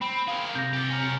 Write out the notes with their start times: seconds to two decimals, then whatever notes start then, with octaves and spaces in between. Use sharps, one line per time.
0.01 C4 B5
0.28 A#3 G#4 F5
0.55 C3 G6 A#6
0.73 G4 A4
0.90 C#4 A#4